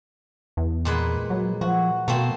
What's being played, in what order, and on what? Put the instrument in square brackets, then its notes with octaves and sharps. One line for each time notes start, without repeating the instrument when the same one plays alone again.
[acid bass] E2
[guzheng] A#2 G#3 B4
[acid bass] F#3
[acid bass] F3 [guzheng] F#4
[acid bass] B2 [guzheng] A3 A#3 C4